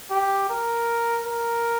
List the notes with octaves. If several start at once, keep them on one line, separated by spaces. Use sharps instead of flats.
G4
A#4
A#4